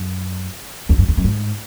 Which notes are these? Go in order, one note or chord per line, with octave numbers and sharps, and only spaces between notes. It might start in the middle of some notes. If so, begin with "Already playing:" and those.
Already playing: F#2
E2
F#2
E2
F#2
G#2